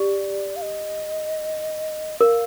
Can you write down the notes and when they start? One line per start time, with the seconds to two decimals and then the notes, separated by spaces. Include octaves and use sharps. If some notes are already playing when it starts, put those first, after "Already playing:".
Already playing: G4 D5
0.56 F5
0.62 D#5
2.21 A#4 F5